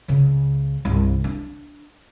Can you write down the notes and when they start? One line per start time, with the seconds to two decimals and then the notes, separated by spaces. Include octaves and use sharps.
0.08 C#2 C#3
0.85 C2 G2
1.24 D4